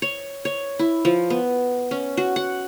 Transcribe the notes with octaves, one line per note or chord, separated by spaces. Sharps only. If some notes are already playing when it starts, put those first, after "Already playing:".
C#5
C#5
E4
F3
B3
C#4
F#4
F#5